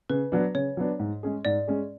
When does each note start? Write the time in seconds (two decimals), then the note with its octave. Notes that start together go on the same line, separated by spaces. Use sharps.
0.09 C#3 B4
0.32 F#3 B3 D4
0.55 C#3 C#5
0.77 F#3 B3 D4
0.99 G#2
1.23 G#3 C#4 G#4
1.45 G#2 D5
1.67 G#3 C#4 G#4